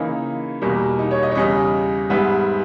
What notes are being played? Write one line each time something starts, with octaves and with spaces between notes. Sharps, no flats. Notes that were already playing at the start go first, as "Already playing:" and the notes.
Already playing: C#3 E3 A#3 D#4
E2 B2 G3 A#3
D#4
C#5
D#5
C#5
E2 C#3 G3 D#5
G#2 G3 B3 E5